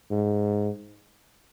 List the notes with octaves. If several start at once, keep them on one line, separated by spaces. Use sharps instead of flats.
G#2